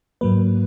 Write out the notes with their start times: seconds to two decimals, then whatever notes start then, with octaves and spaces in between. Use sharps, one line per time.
0.21 G#2 F#3 A#3 B4